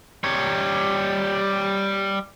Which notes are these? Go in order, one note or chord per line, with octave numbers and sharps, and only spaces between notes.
G3 C#5